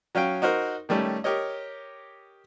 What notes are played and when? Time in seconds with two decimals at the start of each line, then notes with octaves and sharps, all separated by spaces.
0.15 F#3 C#4 F5 G5
0.42 D#4 F#4 A#4 C5
0.89 D#3 G3 A3 C#4
1.24 G4 A#4 C#5 D#5